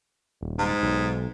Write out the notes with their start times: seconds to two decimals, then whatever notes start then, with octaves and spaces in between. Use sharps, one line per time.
0.41 D#1
0.59 G#2
0.82 B1